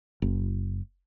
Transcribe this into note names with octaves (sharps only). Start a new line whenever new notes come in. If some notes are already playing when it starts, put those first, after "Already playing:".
F#1